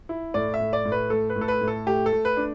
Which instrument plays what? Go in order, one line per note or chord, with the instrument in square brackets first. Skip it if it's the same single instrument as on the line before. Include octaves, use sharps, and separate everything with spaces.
[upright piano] E4
A2 D5
E5
A2
D5
A2
B4
A3 A4
B4
A2
A4
B4
A2
A4
A3 G4
A4
A3
B4
D4